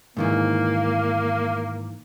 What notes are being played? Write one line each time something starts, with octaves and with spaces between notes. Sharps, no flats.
G#2 D#3 E3 A#3